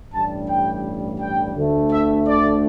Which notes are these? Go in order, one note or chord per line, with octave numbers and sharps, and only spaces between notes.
A1 G2 G3 A5
G5
G5
D2 D3 A3
E5
D5